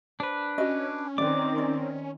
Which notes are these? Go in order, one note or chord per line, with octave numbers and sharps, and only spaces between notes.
D4 B4 C5
C#4 F#4 D#5
D#3 C4 B4 D5 D6
D5